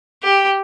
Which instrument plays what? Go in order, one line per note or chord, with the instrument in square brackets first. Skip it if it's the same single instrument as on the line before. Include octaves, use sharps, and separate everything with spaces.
[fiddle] G4